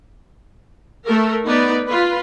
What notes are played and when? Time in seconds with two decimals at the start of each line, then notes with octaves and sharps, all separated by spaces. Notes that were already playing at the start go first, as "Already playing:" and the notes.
1.07 A3 A4 A#4
1.46 B3 D#4 B4 D5
1.89 F4 B4